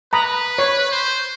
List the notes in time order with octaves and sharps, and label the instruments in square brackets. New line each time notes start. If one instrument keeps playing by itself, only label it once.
[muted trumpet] B4 [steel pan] A#5 B5 D#6
[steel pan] C#5
[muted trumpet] C5